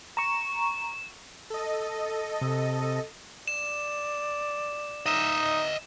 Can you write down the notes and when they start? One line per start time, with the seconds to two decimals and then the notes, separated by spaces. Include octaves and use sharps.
0.17 A#5 C#6 E7
1.50 A4 D#5
2.41 C3
3.48 D5 E7
5.06 D#4 D#5 E5